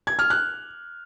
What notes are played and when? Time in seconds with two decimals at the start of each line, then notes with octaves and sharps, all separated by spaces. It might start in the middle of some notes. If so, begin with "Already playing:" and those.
0.07 G#6
0.19 F6
0.30 F#6